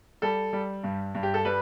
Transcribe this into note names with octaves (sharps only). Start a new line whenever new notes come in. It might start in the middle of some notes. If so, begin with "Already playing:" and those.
G3 A4
G3
G2
G2
G4
A4
G3 B4